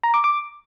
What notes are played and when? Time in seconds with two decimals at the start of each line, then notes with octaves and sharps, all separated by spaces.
0.03 A#5
0.14 D6
0.24 D6